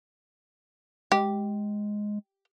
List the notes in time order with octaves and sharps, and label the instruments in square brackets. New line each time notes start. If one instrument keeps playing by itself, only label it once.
[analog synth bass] G#3 [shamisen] G4